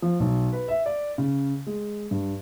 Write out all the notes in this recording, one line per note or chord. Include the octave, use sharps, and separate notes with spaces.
F3
B1
B4
E5
D5
C#3
G#3
G2